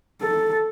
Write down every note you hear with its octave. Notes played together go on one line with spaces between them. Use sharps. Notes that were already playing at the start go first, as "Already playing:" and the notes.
A4